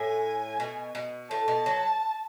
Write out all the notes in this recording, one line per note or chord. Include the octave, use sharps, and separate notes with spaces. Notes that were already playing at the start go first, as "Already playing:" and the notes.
Already playing: A2 G#5
B2
B2
A2 A5
B2
F#3